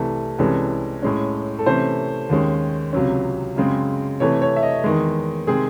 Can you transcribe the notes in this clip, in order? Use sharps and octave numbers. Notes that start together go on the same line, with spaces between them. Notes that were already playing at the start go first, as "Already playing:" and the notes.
Already playing: C2 C3 E3 A3
C2 C3 E3 G#3 C#4 A4
A2 G#3 C#4
A4
C3 E3 A3 C#4 C5
D#2 D#3 G#3 C#4
C#2 C3 F#3 C#4
F#2 C#3 G#3 C4
C3 E3 A3 C#5
C#5
E5
D#5
E2 D#3 G#3
C3 D#3 G#3 C4 G#4